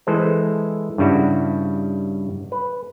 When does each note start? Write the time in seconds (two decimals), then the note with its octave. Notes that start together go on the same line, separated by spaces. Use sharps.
0.07 E3 G#3 A4 C5
0.98 G2 C#3 G3 E4 F#4
2.52 B4